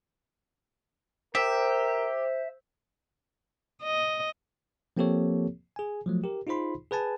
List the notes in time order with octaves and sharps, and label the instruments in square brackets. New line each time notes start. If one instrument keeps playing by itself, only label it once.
[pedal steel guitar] G4 [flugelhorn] A#4 [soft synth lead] C5 [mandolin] E5
[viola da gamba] D#5
[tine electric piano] F3 A#3 C4 G4 A4 C#5
G#4 G#5
F3 F#3 A3
G4 A#4
D#4 F4 G#4 C5 B5 C6
G#4 B4 G#5 A5